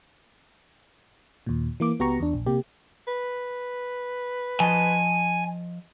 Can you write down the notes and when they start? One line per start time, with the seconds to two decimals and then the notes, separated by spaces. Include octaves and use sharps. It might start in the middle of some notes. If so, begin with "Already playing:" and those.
1.46 D#2 A#2
1.80 E3 A#3 D6
1.99 C#2 B3 F#4 G4 A#5 C#6
2.20 E2 D4
2.34 A#1
2.46 C3 A#3 G4
3.08 B4
4.60 F3 D#5 G#5 A5